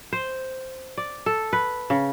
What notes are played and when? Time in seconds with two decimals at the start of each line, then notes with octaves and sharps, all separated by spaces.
0.13 C5
0.97 D5
1.26 A4
1.53 B4
1.90 C#3